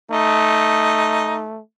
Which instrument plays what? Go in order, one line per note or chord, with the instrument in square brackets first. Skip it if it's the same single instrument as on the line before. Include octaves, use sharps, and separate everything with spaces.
[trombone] A3 [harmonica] D#4